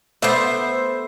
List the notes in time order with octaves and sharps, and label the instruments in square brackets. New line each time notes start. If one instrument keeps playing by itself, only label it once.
[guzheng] A3 B3 D5 [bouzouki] C5 E5